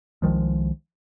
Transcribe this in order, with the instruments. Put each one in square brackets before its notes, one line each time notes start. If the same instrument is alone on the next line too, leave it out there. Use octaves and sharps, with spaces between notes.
[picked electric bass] C2 D#3 F3 G#3